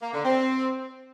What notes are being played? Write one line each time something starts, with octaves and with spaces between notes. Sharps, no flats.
A#3
D3
C4